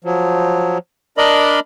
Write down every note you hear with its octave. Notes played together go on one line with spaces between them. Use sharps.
F3 F#3
D4 A#4 D5 D#5 B5